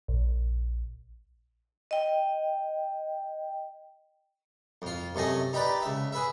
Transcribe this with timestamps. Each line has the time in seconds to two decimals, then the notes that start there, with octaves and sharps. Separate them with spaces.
0.08 A#1
1.91 D#5 G5
4.82 F2 F4
5.15 F#2 C3 A3 D#5 G#5
5.53 D#4 G4 B4 D5
5.82 C#2 E5
6.13 G#4 B4 E5